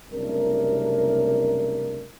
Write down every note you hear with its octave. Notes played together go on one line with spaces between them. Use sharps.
F#1 C2 C3 A3 D4 A#4